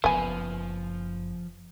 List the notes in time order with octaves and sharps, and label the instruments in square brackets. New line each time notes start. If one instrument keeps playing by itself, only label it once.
[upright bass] F#1 [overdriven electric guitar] F3 [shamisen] B3 G#5